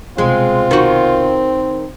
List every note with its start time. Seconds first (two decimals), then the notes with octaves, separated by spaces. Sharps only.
0.18 C2 B2 G#3 C4 F4
0.71 D#3 F#4